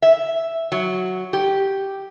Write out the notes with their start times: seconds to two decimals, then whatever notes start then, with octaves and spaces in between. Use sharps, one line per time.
0.02 E5
0.72 F#3
1.33 G4